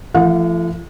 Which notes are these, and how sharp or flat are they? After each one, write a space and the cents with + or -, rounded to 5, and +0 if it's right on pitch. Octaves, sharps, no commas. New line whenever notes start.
F3 -45 A3 +0 F#5 -45